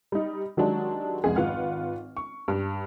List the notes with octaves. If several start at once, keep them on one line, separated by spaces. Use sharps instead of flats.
G3 D#4
D#3 F#3 G#3 D4 F#4 G4
F1 C2 G#3 G#4
G#1 F4 B4 F#5 F6
C#6
G2